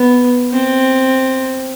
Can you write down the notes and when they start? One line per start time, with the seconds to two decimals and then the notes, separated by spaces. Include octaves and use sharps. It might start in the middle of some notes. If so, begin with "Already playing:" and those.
Already playing: B3
0.53 C4